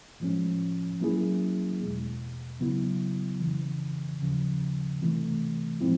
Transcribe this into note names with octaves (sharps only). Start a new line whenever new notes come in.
A2 F3 G#3 C#4
F#3 A#3 C#4 E4 G#4
E2 B2 G#3
C#3 F#3 B3 E4
F2 C#3 E3
D#2 C#3 F3
C3 E3 A3
A2 F3 G#3 C4 E4